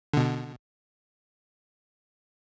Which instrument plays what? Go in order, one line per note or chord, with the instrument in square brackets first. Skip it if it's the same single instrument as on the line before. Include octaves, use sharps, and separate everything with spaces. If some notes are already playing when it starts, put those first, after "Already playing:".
[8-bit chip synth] B2 D3